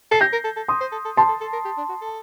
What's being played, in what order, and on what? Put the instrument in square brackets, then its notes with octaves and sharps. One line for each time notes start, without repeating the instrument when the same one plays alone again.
[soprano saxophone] A4 [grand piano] C7
[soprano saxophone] G4 [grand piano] G6 A#6
[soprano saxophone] A#4
A4
A4
[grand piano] C6 D#6
[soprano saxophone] C5
A4
A4
[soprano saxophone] G4 [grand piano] A5 C6
[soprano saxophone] A4
A4
A#4
G4
D4
F#4
A4